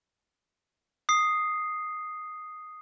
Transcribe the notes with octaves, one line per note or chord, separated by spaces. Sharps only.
D#6 C7